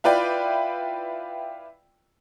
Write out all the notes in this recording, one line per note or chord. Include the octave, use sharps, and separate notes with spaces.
E4 F4 B4 D5 G5